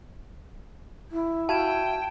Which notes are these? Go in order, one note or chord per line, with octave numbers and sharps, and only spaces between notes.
E4
F#4 E5 F5 G5 A5 G#6 E7